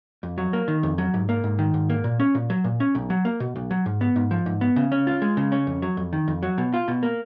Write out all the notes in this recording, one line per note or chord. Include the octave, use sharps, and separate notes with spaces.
F2
F#3
A#3
D#3
F2
F#3
G#2
A#3
G#2
D#3
G#2
A#3
A#2
C#4
A#2
F#3
A#2
C#4
B1
F#3
A#3
B2
B1
F#3
G#2
B3
G#2
F3
G#2
B3
C#3
C#4
F4
G#3
C#3
C#4
F2
F#3
F2
D#3
F2
F#3
B2
F4
B2
A#3